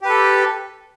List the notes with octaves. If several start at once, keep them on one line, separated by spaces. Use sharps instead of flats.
G4 A4 B4